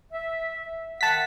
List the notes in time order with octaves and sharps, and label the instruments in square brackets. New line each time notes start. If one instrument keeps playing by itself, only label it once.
[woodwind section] E5
[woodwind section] D#3 E5 F#5 [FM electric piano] A5 B6